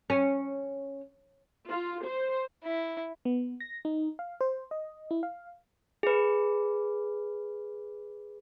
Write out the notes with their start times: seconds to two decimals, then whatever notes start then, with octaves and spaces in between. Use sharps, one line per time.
0.10 C#4
1.68 F4
2.04 C5
2.64 E4
3.25 B3
3.60 A#6
3.85 D#4
4.19 F5
4.41 C5
4.71 D#5
5.11 E4
5.23 F5
6.03 G#4 B4